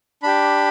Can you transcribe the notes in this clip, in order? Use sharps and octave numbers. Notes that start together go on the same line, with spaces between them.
D4 G4 B5